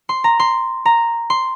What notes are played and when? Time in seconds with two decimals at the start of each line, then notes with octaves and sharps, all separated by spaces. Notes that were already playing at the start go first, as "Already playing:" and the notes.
0.09 C6
0.24 A#5
0.40 C6
0.85 A#5
1.30 C6